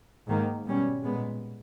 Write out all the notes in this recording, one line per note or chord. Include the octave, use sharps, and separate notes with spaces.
G#2 D#3 A#3
B2 G3 C#4
A#2 G#3 B3